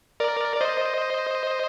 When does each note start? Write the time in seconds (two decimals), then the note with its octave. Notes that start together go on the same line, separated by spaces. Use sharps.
0.20 A#4 D5
0.56 D5
0.61 C5 D#5